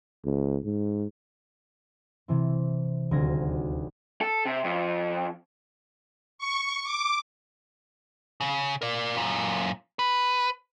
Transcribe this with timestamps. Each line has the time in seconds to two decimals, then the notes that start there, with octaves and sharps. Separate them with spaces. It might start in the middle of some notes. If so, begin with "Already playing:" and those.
0.25 C#2
0.64 G#2
2.28 C3 E3 C4
3.11 D#1 D2 C4 F#4 G#6 A#6
4.21 A4
4.46 C3
4.64 F2
6.38 C#6
6.84 D6
8.41 C#3
8.82 A#4 D5
9.15 F#2 A#2
9.99 B4